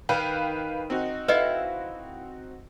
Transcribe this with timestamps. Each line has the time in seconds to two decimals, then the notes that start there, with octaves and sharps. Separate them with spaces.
0.09 D#3 B4 F5 G5
0.90 C4 D#4 F#4
1.28 E4 A4 B4 D#5 F5